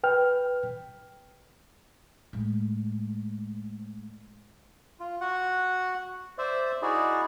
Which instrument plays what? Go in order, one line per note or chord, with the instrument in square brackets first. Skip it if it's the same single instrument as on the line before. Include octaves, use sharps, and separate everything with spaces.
[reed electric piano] B4 G5 F6
[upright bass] A2 G#3
[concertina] F4
F#4 F#5
C5 D5 E5
D#4 E4 F#4 G#4 D5